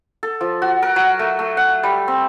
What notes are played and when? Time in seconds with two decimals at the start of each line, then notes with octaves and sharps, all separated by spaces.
0.23 A4
0.41 F3
0.62 F#4
0.82 A#4
0.96 F#3
1.19 A3
1.39 A3
1.57 F#5
1.83 G3
2.08 C4